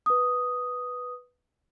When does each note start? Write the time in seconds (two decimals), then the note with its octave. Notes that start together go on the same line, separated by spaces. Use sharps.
0.06 B4 D#6